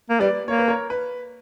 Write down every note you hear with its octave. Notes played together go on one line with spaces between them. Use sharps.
A#3
G3 B4 D5
A#3 C#5
B4
A#4 C#5
B4